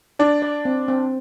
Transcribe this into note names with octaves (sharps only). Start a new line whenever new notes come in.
D4 D5
D5
C4
C4